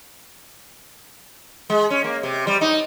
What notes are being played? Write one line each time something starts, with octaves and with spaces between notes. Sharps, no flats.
G#3
C#4
A#3
C3
G3
D#4